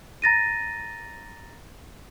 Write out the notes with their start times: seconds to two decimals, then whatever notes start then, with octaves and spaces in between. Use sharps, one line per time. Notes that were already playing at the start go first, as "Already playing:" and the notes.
0.22 A#5 A6 A#6 D#7